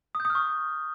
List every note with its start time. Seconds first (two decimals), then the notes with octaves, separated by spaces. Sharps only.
0.15 D#6
0.20 G6
0.25 D#6
0.30 F6
0.35 C#6